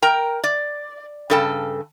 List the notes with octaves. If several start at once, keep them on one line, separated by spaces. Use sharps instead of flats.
A#4 G5 A#5
D5
G2 C#3 A4 G5 A5